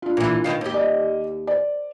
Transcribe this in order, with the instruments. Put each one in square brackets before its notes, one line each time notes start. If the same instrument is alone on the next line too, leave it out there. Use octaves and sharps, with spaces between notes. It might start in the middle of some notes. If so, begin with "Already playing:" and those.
[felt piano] D4 F4
[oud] A#2 E3
B2 D#3 F5
D#2 G4
[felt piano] D5 D#5
C5 D5